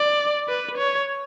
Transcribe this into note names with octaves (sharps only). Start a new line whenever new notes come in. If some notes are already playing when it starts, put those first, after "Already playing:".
Already playing: D5
B4
C#5